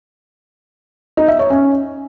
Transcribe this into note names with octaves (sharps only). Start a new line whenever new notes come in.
D#4
E5
C#5
C#4